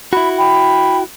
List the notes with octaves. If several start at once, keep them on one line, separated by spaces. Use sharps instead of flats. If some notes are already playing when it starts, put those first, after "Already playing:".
E4 F#4 B5
G5 B5